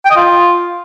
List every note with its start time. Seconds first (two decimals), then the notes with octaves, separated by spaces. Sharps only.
0.05 G5
0.10 D#5
0.16 F4